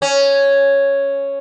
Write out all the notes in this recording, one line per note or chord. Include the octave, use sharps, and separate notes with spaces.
C#4